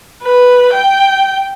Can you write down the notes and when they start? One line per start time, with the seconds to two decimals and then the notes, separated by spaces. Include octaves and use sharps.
0.23 B4
0.73 G5